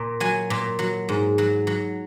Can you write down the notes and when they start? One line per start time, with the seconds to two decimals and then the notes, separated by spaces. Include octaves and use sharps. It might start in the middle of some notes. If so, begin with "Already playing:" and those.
Already playing: A#2
0.20 F#3 G#5
0.50 A#2
0.79 F#3
1.09 G#2
1.38 F#3
1.67 F#3